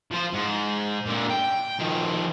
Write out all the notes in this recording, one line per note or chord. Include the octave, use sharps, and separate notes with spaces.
F3 C5
G#2
A#2 D3
G5
D#3 F3